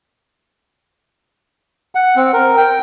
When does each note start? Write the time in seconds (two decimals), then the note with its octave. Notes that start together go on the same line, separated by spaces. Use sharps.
1.95 F#5
2.16 C4
2.34 A#4
2.57 G5